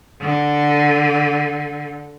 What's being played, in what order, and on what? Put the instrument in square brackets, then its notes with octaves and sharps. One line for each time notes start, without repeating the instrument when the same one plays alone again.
[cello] D3